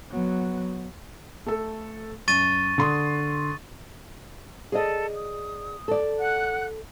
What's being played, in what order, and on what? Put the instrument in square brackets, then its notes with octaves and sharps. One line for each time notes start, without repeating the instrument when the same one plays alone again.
[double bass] F#3 B3
[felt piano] A3 A4
[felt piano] F#2 [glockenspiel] C#6 A6 D#7
[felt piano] D3 C6 D#6
[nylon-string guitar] G#4 D5 D#5 [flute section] A4
[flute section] D#6
[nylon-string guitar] A4 D5
[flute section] F#5 F#6